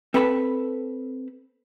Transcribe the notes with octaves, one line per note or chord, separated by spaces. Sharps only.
C4 A4 B4 A5 B5